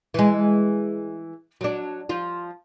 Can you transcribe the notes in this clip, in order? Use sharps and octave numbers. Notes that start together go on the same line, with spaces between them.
E3 G#3
F#3 D4
F3 F4